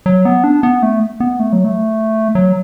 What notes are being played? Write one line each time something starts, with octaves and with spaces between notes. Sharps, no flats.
F#3
B3
D4
B3
A3
B3
A3
F#3
A3
F#3